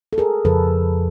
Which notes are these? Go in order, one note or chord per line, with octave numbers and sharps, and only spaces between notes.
A4
G#4 A#4
F2 C#3 F3 A4 B4